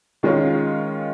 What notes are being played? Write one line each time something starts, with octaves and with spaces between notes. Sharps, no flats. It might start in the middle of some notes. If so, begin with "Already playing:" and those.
D#3 G#3 C#4 F4